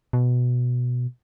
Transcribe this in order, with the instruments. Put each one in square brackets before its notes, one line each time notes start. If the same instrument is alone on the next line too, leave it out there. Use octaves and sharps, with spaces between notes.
[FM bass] B2